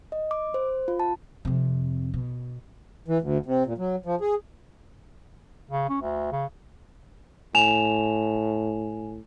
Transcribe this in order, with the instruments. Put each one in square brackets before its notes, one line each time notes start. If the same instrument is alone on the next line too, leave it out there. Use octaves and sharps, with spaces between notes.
[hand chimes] D#5
D6
C5
F4
A5
[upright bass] F2 C3
B2
[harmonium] E3
D2
C3
A#2
F#3
F3
G#4
[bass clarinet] C#3
C#4
D2
C#3
[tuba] A2 [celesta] G#5 E7 F7